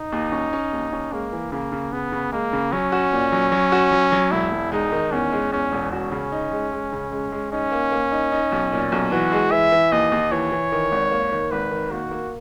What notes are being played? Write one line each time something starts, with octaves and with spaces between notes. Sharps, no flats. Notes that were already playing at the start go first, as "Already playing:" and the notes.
Already playing: D#4
D#2
C#4
C#4
D#2
C#4
G#3 A#3
E3
C#3 A#3
C#3
C#3 B3
C#3
G#3 A#3
C#3
F#3 C#4
F#4
A#2
F#3
F#3
F#4
F#3
F#3
E1 E4
E1
G#3 D#4
D#3
E2 C#4
G#3
E2 C#4
E1
C#4 F#4
C#3
D#4
G#3
G#3
C#3
G#3
G#3
C#4 D#4
A#3
A#3
D#4
D#4
B1
A#2
B1
E3 F#4
G#3
E3 E5
E3
D#2 D#5
D#2
E3 C#5
E3
D#3
G#1
A#3
D#3
G#1 B4
D#3
A#3 F#4
A#3